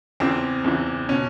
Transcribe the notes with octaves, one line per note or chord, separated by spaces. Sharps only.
E2 C#3 E3 C4
E2 C#3 E3
B2 C#4